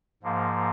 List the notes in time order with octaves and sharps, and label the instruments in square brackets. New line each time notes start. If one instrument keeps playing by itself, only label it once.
[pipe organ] G#2 F3 A#3